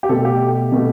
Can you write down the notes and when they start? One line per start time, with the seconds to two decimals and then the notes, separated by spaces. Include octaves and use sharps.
0.03 G4
0.09 B2 A3 A4
0.25 G4
0.72 B2 A3